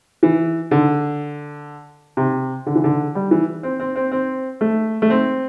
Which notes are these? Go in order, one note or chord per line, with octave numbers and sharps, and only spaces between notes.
E3
D3
C3
D3
E3
D3
G3
E3
C4
C4
C4
C4
A3
A3
C4